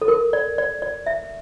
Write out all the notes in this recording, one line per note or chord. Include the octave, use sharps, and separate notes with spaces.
A4
A#4
D5
D5
D5
E5